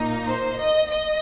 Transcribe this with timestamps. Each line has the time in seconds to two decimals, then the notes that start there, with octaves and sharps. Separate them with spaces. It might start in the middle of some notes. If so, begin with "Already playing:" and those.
Already playing: A#2 A#3 D#4
0.28 C5
0.60 D#5
0.90 D#5